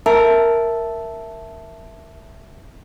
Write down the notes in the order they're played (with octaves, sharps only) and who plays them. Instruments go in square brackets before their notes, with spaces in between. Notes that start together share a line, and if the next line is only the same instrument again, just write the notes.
[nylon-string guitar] A#4 [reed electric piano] E5 A5